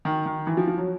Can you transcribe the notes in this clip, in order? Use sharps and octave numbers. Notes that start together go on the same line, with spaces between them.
D#3
D#3
E3
F3
F3
F#3